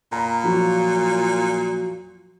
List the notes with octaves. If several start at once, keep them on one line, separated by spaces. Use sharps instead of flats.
A#2 A#5 B5
F3 F#3 F#4